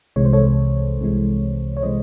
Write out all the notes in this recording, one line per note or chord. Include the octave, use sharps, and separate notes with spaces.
C2 C3 E3 G#3 C#5
C5
A4 C#5
C2 C3 E3 G#3
C#5
C3 E3 G#3 C5 D#5